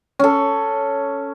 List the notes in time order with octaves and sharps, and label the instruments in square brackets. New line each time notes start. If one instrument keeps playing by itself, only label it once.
[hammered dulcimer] C#4 A4